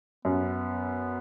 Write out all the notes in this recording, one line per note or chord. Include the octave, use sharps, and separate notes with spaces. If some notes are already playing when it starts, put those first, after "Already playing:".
F#2 B3